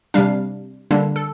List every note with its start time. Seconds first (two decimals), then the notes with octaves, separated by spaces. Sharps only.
0.14 C3 G3 D4 F5
0.91 D3 G3 A#3 D4
1.16 A4